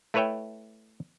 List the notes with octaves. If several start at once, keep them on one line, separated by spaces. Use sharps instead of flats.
A3 E4 B4 C#5 E5 G5